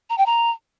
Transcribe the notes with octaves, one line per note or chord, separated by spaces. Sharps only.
A#5
G5
A#5